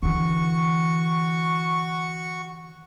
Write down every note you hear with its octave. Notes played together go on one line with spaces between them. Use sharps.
D3 E3 F#4 C#6